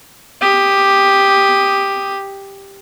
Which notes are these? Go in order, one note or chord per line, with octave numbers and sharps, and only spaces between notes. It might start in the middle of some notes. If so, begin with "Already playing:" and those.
G4 D#6